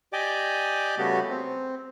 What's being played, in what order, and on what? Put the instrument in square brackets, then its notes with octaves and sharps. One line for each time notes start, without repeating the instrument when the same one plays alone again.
[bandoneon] G4 D5 D#5 G5 G#5 D6
C#3 G3 A3 B3 F#4 G4
C4